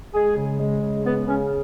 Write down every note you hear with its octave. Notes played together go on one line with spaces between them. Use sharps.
G#3 G#4
C#3
G#3
C#3
G#3 B3
C#3 C#4